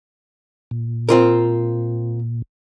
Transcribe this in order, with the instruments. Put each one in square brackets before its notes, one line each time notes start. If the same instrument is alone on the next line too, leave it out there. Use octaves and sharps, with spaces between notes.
[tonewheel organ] A#2
[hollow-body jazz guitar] C4 F4 A#4